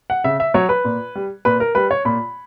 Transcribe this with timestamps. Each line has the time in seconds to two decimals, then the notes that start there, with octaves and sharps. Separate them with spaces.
0.10 F#5
0.24 C#3 E5
0.40 E5
0.54 F#3 C#5
0.69 B4
0.85 A#2
1.15 G3
1.45 A#2 B4
1.60 A#4
1.75 G3 B4
1.91 C#5
2.05 A#2 B5